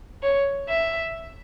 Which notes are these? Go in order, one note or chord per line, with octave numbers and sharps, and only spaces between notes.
C#5
E5